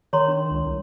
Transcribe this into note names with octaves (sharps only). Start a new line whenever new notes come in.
D#3 C#5 A#5 C6
D4
C#2
C2